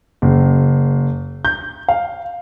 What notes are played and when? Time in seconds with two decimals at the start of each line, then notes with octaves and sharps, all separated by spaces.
0.22 F#1
1.45 G6
1.88 F5